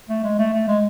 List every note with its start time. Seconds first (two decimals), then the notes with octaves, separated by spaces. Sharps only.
0.09 A3
0.24 G#3
0.39 A3
0.53 A3
0.68 G#3